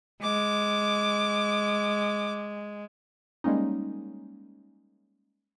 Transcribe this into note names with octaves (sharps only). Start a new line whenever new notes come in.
G#3 D6
G3 G#3 A#3 C#4 D#4